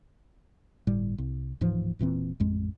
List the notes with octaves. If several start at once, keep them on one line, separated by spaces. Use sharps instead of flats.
G1 A2 G3
C2
D1 G#2 E3 F3
E1 A#2 E3 C4
A1 F2 G#3